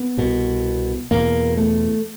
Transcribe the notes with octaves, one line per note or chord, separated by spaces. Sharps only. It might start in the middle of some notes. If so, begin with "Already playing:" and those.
Already playing: B3
C2 B2
E2 B2 A#3
A3